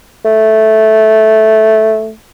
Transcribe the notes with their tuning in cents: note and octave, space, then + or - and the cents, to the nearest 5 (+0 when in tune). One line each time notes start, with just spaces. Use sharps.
A3 -5